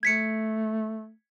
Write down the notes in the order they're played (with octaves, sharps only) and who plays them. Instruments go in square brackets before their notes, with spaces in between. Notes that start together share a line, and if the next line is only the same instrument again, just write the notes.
[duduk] A3 [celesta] G#6 B6 C#7